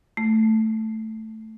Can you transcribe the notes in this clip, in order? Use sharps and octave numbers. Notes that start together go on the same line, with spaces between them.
A3